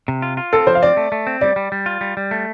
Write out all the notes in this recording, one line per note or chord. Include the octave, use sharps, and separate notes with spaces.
C3
F4
F4
C4 A4
F3 C5
F5
C4 D5
A3
A3
C4
G3 D5
G3
G3
F4
G3
G3
A3